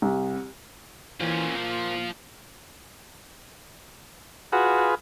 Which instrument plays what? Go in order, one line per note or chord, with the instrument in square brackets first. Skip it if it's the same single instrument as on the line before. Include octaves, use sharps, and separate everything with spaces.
[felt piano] C2
[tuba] E3 [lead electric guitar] A#3 F4 [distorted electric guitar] C#4 C5
[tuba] A#2 [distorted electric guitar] F3 C5
[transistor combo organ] F4 G#4 B4 [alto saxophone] F#4